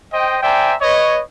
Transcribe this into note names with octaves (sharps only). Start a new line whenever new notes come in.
C5 D#5 G5
C5 D5 E5 G5 G#5 A#5
B4 C#5 D#5